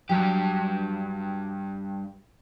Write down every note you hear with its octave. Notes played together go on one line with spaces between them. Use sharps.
G2 F#3 G4